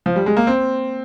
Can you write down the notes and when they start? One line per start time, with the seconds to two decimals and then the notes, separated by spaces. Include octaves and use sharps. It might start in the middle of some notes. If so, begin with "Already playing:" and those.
0.06 F3
0.16 G3
0.26 G#3
0.37 A#3
0.47 C4